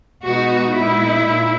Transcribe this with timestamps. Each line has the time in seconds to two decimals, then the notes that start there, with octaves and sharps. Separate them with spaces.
0.23 B2 G#3 B3 D#4 F#4
0.77 A#2 G#3 D#4 E4
1.28 A#2